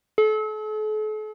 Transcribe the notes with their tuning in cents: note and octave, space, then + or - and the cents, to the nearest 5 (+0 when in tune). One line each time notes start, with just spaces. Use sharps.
A4 -40